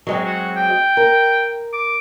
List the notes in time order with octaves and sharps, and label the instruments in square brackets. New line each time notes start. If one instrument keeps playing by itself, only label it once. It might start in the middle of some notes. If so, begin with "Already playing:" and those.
[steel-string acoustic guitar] F#3 G#3 C4
[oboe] F#4
G5
[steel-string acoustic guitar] A#4
[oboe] D6